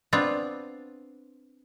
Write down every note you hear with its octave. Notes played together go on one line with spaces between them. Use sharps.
B3 C4 D4 F4